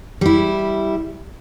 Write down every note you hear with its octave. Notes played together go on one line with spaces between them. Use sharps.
G3 E4